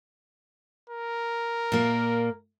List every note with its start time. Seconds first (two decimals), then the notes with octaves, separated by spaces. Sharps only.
0.90 A#4
1.72 A#2 A#3